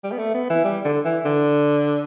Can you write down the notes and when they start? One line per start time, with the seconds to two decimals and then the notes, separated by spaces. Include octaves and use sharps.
0.04 G3
0.12 B3
0.19 A3
0.34 B3
0.50 E3
0.64 G3
0.85 D3
1.05 E3
1.25 D3